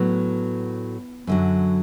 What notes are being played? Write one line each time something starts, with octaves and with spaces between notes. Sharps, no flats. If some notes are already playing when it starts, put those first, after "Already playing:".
Already playing: A2 F#3 B3
F#2 D3 F#3